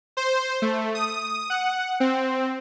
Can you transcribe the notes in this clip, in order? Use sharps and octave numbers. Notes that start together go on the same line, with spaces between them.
C5
A3
D#6
F#5
C4